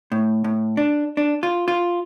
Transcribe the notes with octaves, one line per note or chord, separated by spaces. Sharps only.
A2
A2
D4
D4
F4
F4